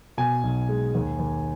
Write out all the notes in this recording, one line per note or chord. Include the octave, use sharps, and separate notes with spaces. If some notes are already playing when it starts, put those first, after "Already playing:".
B2 G#5
B1
G#3
D#2
D#2